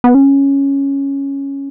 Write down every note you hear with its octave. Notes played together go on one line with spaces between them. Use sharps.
B3
C#4